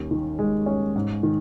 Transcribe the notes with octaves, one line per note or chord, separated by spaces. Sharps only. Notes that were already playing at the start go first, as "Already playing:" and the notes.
Already playing: D#2 C#4
D#3
G#3
C#4
G#2
D#3